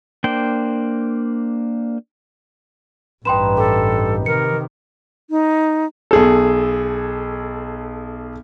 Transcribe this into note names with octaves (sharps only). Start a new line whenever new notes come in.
A#3 D4 C5 G5
A1 G2 D#4 B4 G5 C6 E7
G4 A4
C3 D#3 A#4 C#7
D#4
B1 G#4 A4